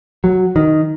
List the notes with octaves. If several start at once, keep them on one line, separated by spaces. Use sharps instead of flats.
F#3
D#3